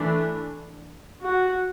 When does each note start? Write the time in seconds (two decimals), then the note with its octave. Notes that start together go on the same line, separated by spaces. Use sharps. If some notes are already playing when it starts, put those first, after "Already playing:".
Already playing: E3 A3 D4
1.25 F#4